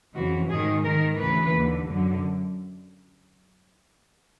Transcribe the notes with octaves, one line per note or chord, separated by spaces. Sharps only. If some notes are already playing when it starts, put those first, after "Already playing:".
F2 C#3 E3 F#4
G#2 D#3 G#4
G#2 D#3 A#4
D2 C#3 E3 B4
D#2 D3
F#2 D3